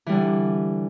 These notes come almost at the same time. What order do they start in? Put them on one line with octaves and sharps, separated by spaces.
E3 G3 D3